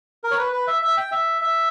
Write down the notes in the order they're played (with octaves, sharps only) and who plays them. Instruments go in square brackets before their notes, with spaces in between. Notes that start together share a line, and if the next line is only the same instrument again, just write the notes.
[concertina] A#4
C#5
B4
B4
E5
E5
G5
E5
E5